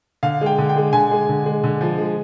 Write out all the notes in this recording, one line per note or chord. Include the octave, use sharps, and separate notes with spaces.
D3 F5
G#3 G5
D3
G5
G#3
D3 G#5
G#3
D3
G#3
D3
F3
G#3